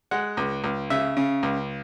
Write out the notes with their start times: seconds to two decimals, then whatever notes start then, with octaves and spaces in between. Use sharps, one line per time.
0.11 G#3 F#5
0.37 C#2
0.64 C#2
0.90 C#3 E5
1.17 C#3
1.43 C#2